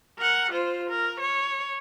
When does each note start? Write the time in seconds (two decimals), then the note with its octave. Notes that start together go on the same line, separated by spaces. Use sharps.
0.18 A#4 F#5
0.51 F4 C5
0.90 A#4
1.20 C#5